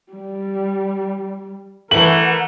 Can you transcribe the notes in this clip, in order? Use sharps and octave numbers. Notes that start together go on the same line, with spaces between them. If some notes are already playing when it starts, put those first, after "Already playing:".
G3
E3 A3 A#4 F#5 F#7